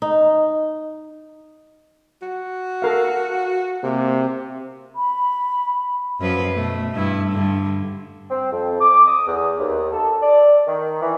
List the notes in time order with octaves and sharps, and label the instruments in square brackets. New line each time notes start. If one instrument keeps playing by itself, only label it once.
[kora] D#4
[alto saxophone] F#4
[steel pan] A4 A#4 F5
[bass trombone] C3 [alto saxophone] A#3
[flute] B5
[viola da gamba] F#2 F3 B4
B2 A3
G2 E4
G2 D3
[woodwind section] C4
F2
D6
D#6
E2
D#2
A4
D5
D#3
E3